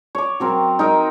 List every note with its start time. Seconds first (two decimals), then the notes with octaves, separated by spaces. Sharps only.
0.15 C#5 D6
0.40 F#3 C4 A#4
0.79 D#4 A#4 G5